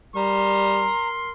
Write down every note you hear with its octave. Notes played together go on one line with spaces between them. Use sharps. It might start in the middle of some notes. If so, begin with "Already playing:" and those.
G3 A#4 A#5 C6